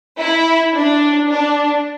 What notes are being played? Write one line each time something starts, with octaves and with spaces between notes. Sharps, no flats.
E4
D4
D4